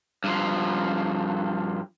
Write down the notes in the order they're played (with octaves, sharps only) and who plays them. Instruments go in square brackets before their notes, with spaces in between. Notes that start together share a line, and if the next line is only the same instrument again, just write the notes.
[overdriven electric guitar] G2 F3